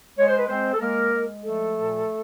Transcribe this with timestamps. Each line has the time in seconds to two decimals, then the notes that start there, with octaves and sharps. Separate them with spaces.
0.18 G#3 C#5
0.28 C5
0.38 B4
0.48 G#3 C4 C5
0.74 A4
0.81 G#3 A#3 A#4
1.13 G#3
1.44 F3 A3 A4
1.76 A#2